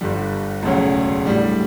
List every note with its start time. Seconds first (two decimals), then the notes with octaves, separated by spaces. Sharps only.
0.01 G1 G2 D3 G3
0.63 E1 D2 C#3 F#3
1.25 A2 G3 D4